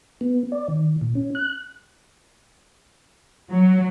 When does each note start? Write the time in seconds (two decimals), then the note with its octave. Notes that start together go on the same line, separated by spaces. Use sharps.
0.21 B3
0.52 D5
0.68 D#3
1.01 A#2
1.15 C#4
1.35 F#6
3.51 F#3